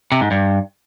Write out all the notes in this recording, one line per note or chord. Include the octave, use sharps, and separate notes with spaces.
C3
G#2
G2